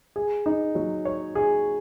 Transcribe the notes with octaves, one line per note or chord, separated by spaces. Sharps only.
G#4
D#4
F#3
C#5
G#4